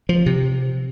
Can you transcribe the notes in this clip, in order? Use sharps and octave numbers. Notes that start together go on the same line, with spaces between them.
F3
C3